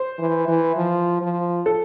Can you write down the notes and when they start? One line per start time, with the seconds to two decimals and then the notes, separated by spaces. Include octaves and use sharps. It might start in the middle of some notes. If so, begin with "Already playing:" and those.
Already playing: C5
0.19 E3
0.48 E3
0.77 F3
1.21 F3
1.66 A4